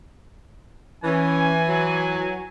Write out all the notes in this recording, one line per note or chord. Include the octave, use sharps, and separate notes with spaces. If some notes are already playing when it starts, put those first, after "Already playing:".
E3 C#4 G#5
F#3